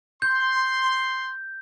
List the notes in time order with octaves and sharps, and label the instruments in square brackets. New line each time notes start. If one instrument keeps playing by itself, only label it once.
[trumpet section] C6 [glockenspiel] G6